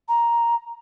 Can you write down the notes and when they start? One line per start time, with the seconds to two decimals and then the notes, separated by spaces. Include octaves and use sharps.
0.08 A#5